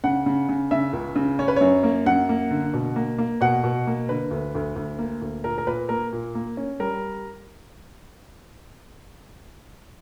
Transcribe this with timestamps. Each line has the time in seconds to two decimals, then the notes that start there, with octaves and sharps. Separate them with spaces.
0.04 C#3 F#5
0.26 C#3
0.49 C#3
0.71 C#3 E5
0.93 C#2
1.15 C#3
1.39 C#4 C#5
1.48 B4
1.56 F#2 C#5
1.83 A#3
2.06 F#2 F#5
2.29 A#3
2.51 D3
2.73 B2
2.96 A#3
3.18 A#3
3.41 B2 F#5
3.64 B2
3.87 A#3
4.09 D3 B4
4.31 D2
4.55 D2
4.76 D2
4.99 A#3
5.22 D2
5.44 A#2 A#4
5.58 A#4
5.67 A#2 B4
5.89 A#3 A#4
6.13 A#2
6.35 A#3
6.57 C#4
6.80 G3 A#4